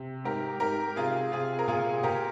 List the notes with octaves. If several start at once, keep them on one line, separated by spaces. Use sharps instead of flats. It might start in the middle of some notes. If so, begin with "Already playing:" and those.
Already playing: C3
G#2 G4 A#4
G#2 G4 A#4
C3 F4 G#4
C3 F4 G#4
A#4
A#2 F4 G#4
A#2 G4 A#4